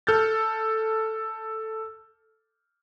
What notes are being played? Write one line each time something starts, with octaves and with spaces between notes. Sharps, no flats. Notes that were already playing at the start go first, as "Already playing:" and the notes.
A4 F6 G6 A6